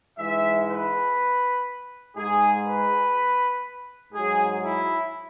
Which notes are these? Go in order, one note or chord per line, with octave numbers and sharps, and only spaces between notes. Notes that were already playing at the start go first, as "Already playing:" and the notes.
G#2 E3 G#3 E5
B4
G#2 G#3 G#4
B4
G#2 F#3 G#4
E4